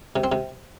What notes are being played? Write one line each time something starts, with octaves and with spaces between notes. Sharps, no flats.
C3
C4
C3